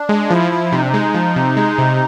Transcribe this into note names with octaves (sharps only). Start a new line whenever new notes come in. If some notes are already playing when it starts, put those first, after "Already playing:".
Already playing: D4
G#3
F4
F3 E4
F3
C3 D#4
D4
D#4
G#3
F3
C3
G#3
C3